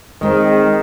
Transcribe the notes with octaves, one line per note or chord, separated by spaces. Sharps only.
D#3 G#3 C4